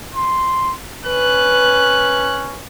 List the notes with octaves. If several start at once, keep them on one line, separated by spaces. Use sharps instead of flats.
C6
C#4 B4 F#6